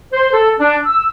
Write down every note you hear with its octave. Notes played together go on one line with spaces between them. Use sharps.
C5
A4
D4
E6